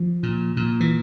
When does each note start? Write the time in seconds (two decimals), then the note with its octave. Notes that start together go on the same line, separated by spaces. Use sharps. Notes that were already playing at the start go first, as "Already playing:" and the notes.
Already playing: F3
0.23 A#2
0.57 A#2
0.80 E3